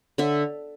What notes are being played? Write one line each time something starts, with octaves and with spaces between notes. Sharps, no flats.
D3 E5